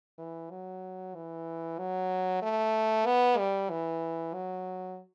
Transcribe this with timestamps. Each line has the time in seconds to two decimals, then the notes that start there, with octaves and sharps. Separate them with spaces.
0.19 E3
0.51 F#3
1.15 E3
1.79 F#3
2.43 A3
3.06 B3
3.38 G3
3.70 E3
4.34 F#3